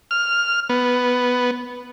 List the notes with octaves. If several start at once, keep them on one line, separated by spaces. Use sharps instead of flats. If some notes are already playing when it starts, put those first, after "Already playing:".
F6
B3